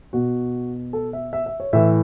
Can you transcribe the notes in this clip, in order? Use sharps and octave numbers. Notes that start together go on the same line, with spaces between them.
B2 F#4
A4
E5
E5
E5
C#5
A2 E3 E5